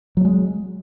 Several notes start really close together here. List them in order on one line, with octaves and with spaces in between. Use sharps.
F#3 A3 G#3